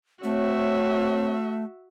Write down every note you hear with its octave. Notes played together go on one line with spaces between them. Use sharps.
A3 C4 F#4 C#5 E5